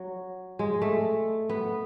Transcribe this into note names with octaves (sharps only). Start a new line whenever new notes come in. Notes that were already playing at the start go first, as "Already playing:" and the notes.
Already playing: F#3
G#3
A3
B3